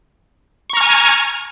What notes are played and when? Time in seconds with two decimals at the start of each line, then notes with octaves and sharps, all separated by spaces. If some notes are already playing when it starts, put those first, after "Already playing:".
0.70 C#6
0.73 A#5
0.77 F6
0.81 G#5